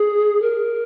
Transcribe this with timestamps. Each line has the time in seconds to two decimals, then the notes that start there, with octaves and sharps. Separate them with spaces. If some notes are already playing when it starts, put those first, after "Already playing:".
Already playing: G#4
0.42 A#4